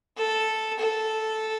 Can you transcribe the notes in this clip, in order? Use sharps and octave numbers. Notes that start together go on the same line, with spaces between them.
A4
A4